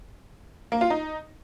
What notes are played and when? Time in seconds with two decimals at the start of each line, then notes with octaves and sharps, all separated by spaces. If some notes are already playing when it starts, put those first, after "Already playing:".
0.72 A#3
0.81 F4
0.90 D#4